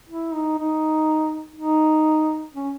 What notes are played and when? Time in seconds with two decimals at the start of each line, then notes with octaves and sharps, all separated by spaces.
0.09 E4
0.33 D#4
0.58 D#4
1.56 D#4
2.55 C#4